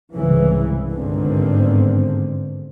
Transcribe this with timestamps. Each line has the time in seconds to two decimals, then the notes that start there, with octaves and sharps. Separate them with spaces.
0.15 C2 G#2 C#3 E3
0.92 G1 G#2 D3 D#3 C4